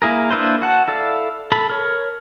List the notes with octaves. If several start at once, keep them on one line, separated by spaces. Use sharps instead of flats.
A#3 E4 G#4 A#4
A#3 D4 E4 B4 C5
F#4 F#5 A5
E4 A4 D5 F5
A4 B5
A#4 C#5